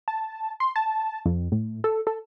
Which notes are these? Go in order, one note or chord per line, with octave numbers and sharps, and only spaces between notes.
A5
C6
A5
F2
A2
A4
A4